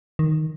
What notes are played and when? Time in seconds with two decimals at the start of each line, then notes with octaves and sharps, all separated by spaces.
0.19 D#3